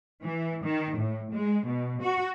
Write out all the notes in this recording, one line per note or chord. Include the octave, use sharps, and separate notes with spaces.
E3
D#3
A2
G#3
B2
F#4